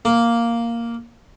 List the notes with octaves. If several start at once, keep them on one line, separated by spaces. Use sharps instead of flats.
A#3